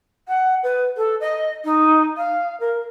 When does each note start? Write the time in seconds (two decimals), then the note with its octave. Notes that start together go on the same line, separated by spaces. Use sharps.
0.28 F#5
0.63 B4
0.97 A4
1.21 D#5
1.64 D#4
2.17 F5
2.60 A#4